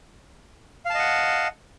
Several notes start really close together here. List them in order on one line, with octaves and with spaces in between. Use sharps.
F5 A5 D#5 F#5